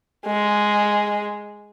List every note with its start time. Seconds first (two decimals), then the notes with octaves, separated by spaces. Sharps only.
0.26 G#3